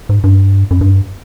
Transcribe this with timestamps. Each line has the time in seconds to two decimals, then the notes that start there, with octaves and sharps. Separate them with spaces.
0.09 G#2
0.24 G2
0.71 F#2
0.81 G2